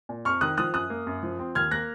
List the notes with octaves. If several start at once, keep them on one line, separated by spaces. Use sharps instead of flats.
A#2
F2 C#6 F6
D#3 D#6 F#6
F3 D#6 F#6
F#2 D#6 F#6
A#3
F#2
F3
C4
D#2 F6 G#6
A#3 F#6 A#6